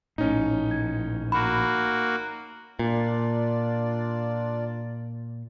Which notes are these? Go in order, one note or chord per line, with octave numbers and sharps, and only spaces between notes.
A#1 A2 C#4 D#4
G#6
A#3 F#4 B5
A#2 D4 F4 D5